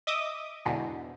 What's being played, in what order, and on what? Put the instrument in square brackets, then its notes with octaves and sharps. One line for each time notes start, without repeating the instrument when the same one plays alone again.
[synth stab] D#5 E5 D6 D#6
E2 G#2 B2 D3